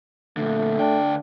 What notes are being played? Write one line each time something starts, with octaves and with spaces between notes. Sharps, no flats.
A#2 D3 A3
D2 D4 G5